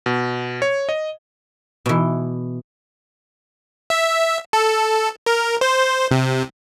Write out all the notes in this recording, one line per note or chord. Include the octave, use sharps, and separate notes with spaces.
B2
C#5
D#5
B2 E3
E5
A4
A#4
C5
C3